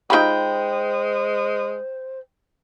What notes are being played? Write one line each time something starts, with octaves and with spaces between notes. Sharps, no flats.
G#3 D#4 F4 G4 C5 G5 B5